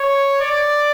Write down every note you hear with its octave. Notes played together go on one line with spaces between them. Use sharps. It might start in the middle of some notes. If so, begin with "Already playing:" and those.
Already playing: C#5
D5